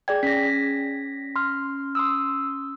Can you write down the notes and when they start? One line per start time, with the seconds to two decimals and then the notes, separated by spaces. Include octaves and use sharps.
0.08 G#4 D5 G5 G#6
0.23 C#4 A#6 B6
1.36 C6 F6
1.95 C6 D#6 E6